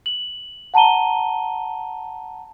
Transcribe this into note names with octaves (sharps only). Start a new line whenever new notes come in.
F#7
F#5 A5 A#5 D#7 G7